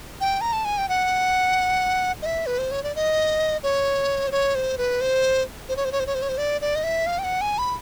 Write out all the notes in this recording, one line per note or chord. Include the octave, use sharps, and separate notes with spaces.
G5
A#5
A5
G#5
G5
F#5
D#5
E5
B4
C5
C#5
D5
D#5
C#5
C5
C#5
C5
B4
C5
C5
C#5
C5
C#5
C5
C#5
C5
C#5
C5
D5
D5
D#5
E5
F5
G5
F#5
G#5
B5